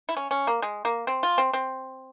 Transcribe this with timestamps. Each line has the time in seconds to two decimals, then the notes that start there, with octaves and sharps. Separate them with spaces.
0.09 E4
0.17 C#4
0.31 C#4
0.47 A#3
0.62 G#3
0.85 A#3
1.07 C4
1.23 F4
1.38 C4
1.53 C4